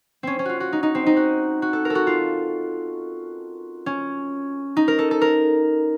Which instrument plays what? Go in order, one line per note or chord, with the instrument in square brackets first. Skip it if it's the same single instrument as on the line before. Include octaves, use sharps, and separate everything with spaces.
[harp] C4 C#4
C#4
F4 F#4
F#4
D#4
D#4
C4
D#4
F#4
F#4
A4
A#4
A4
F#4
F4
C#4
D#4
A#4
A4
A4
A#4